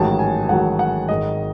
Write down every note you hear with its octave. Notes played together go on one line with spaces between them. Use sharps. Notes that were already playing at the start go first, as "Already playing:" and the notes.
Already playing: A1 G#2 D#3 F#3 A5
G#5
A1 G#2 D#3 F#3 F#5
F#5
G#1 G#2 D#3 D#5